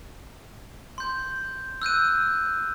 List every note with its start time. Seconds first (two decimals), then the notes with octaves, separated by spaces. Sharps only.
0.98 C6 G6
1.82 E6 F#6 G6 D#7